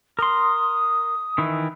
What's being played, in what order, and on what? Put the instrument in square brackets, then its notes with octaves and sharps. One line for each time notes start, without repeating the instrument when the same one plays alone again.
[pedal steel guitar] A#4 C6 [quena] D#6
[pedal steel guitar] D#3 E3 E4